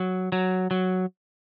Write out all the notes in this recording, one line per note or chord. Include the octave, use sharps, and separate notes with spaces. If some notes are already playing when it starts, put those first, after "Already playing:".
Already playing: F#3
F#3
F#3